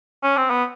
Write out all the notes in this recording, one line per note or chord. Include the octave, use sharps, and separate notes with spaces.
C#4
C4
B3